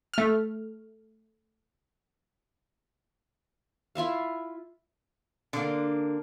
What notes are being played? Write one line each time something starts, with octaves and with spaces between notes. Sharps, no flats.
A3 F6
E4 F4 E5 F5
D3 A#3